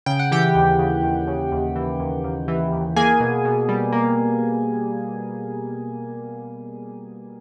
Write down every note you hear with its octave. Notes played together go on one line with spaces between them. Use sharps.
C#3 G5
F#5
E3 G4 G5
D#2
C#3
D#2
C#3
D#2
E3
D#2
D#2
E3
D#2
A#3 G#4 G#5
B2
B2
G3
A#3